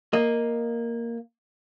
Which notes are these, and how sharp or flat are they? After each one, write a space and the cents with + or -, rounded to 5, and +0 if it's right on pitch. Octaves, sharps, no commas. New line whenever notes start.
A#3 +0 D#5 +0